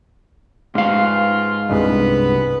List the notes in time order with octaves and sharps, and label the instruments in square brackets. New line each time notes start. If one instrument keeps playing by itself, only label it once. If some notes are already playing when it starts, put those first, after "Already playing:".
[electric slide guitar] G#2 F5 [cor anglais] F4
[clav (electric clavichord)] C2 G2 G#3 [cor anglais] B3 [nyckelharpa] B4